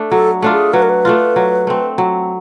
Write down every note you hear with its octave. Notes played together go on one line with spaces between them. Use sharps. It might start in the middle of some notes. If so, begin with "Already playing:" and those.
Already playing: A3 D4
F#3 A4
A3 D4 F4
G#4
F#3 B4
A#4
B4
A3 D4 F4
F#3
A3 C4
F#3